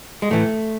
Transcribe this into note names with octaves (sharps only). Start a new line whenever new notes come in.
G#3
A2 E3 A3